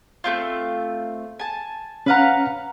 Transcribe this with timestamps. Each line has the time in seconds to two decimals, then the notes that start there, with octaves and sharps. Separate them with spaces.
0.24 A3 C4 F4
1.39 G#5 A5
2.06 C#4 B4 F5 F#5 A#5